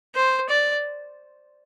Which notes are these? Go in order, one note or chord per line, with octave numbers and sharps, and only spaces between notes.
C5
D5